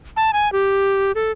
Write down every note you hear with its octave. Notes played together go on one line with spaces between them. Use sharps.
A5
G#5
G4
A4